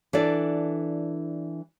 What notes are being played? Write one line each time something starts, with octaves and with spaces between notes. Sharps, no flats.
E3 D4 A4 D5